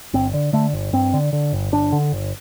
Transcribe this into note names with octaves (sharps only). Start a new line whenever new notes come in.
G1 C4
D3
D3 A3
G1
G2 C4
D3
D3
G1
G1 D4
D3
G1